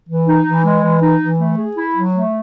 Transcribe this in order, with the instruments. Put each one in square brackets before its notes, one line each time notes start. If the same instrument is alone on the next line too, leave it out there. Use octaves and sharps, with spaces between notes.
[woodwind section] E3
D#4
E3
G#3
E3
D#4
E3
A3
G#4
E4
F#3
A3